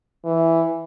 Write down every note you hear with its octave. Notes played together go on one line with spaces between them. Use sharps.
E3